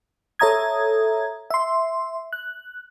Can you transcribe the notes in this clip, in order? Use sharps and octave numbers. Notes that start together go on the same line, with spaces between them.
A4 C#5 E5 A#5 D#6 G#6
E5 C6
F#6